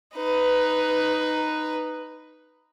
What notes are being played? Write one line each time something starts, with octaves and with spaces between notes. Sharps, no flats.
D#4 B4